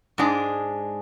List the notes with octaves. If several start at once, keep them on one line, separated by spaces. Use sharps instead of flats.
G#2 G#3 D4 G#4